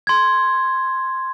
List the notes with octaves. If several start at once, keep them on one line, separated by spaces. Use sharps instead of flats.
C6 G#6